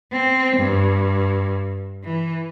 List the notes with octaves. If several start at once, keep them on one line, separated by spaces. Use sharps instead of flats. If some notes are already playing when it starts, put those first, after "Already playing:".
C4
G2
E3